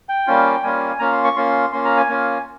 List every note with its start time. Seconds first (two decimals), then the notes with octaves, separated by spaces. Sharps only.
0.09 G5
0.27 G3 A#3 C#4 F4
0.63 G3 A#3 C#4 F4 G#5
0.99 A#3 C#4 F4 A#5
1.12 C6
1.24 C#6
1.36 A#3 C#4 F4 C6
1.72 A#3 C#4 F4 C6
1.85 A#5
1.97 G#5
2.09 A#3 C#4 F4